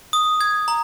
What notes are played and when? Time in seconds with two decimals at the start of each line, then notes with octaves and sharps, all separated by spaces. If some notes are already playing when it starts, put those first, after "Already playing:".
0.13 D#6
0.41 G#6
0.68 A#5